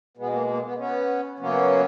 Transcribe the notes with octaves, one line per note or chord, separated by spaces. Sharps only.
B2 G#3 B3
A#3
A#3
B3
B3 C#4
F#2 C#3 F#3 A#3 B3 C#4